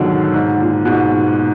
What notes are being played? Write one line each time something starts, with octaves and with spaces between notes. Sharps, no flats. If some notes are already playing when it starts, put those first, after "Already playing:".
Already playing: G#2 B2 D3 D#3 F3 F#3
G#2
A#2
G#2 B2